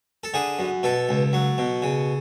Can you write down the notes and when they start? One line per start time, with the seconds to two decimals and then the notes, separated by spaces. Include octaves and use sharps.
0.24 A4
0.34 D3 G#4
0.59 F#2
0.83 B2 A4
1.09 C#2
1.33 F#3
1.58 B2
1.82 C#3